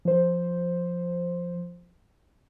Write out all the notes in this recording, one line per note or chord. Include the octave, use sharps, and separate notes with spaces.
F3 C5